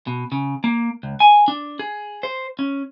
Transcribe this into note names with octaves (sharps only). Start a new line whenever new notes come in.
B2
C#3
A#3
C#2
G#5
D4
G#4
C5
C#4